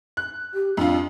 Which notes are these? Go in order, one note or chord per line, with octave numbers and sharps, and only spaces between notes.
F#6
G4
F2 D4 F4